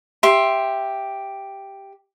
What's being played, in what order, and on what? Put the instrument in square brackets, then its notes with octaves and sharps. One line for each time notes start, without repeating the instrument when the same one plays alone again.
[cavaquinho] G4 E5 C6